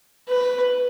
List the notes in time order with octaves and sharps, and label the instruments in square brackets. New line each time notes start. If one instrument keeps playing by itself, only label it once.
[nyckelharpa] B4